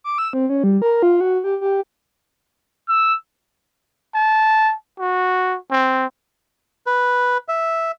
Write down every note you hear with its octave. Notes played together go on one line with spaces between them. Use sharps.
D6
E6
C4
C#4
G3
A#4
F4
F#4
G4
G4
E6
A5
F#4
C4
B4
E5